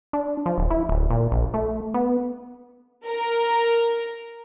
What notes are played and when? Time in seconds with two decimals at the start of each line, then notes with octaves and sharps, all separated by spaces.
0.13 D4
0.46 F3
0.58 D1
0.70 E4
0.89 D1
1.10 A#2
1.31 A#1
1.54 A3
1.94 B3
3.06 A#4